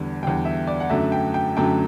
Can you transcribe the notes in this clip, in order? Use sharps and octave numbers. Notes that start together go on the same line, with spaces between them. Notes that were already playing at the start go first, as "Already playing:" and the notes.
Already playing: E2 D3 G3
E2 D3 G3 G5
E5
D5
F#5
F#2 D3 F#3 A3 E5
G5
G5
F#2 D3 F#3 A3 G5